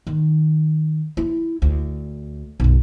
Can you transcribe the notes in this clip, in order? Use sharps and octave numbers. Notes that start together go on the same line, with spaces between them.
D#3
E4
D2
B1 F#2